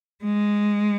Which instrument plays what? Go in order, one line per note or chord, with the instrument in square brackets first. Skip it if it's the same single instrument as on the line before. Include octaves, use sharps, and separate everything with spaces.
[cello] G#3